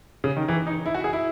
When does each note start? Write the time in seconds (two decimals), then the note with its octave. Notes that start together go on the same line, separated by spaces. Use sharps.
0.24 C#3
0.36 D#3
0.48 E3
0.67 D#4
0.86 E4
0.94 F#4
1.04 G#4
1.13 E4